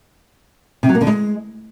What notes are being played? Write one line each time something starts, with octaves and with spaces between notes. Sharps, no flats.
C3
F#3
A#3
D3
G#3